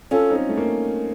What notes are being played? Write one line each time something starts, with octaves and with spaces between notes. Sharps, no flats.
C#4 F4 A4
C4 D#4
A3
A#3